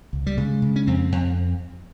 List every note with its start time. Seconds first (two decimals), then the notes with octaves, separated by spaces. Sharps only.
0.13 C#2
0.27 G3
0.37 C#3 G#3
0.62 C#3
0.76 C#4
0.87 F2 C4
1.12 F2